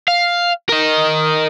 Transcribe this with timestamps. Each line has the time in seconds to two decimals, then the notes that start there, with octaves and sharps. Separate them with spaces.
0.08 F5
0.69 A#4 D#5